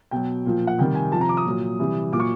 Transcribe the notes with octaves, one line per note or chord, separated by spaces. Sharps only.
B2 F#3 G5
A#2 F3
F#5
C3 D#3 G3 G5
G#5
C3 F3 A5
A#5
D6
D#6
A#2 F#3
C3 E3 G3
A#2 F#3 C#6 D6